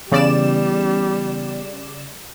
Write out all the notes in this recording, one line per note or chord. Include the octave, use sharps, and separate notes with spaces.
C#3 E3 G3 B3 D5 E7